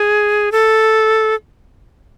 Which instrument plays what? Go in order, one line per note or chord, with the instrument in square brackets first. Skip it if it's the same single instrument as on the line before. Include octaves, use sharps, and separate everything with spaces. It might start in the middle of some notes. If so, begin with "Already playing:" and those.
Already playing: [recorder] G#4
A4